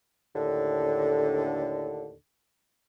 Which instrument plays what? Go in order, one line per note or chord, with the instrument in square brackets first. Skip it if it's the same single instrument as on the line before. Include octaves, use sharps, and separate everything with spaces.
[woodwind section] D#2 A2 D3